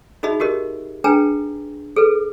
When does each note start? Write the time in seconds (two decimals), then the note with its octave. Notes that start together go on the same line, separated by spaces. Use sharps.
0.23 D#4 F#4 G#4 D#5 E5 B5
0.40 F#4 G4 A#4 D#5
1.04 D4 G#4 B4 G5 G#5 A#5
1.96 G#4 A4 B4